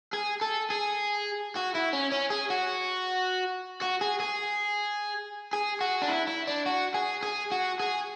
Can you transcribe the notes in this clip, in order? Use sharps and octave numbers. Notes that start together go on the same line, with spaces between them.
G#4
A4
G#4
F#4
E4
C#4
C#4
G#4
F#4
F#4
G#4
G#4
G#4
F#4
D4
E4
E4
D4
F#4
G#4
G#4
F#4
G#4